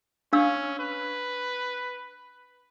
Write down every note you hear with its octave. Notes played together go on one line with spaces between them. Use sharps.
C#4 D4 F5 E6
B4